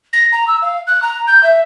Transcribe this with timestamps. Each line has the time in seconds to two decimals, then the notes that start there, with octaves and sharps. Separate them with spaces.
0.13 A#6
0.32 A#5
0.48 E6
0.62 F5
0.87 F#6
1.03 A#5
1.27 G6
1.43 E5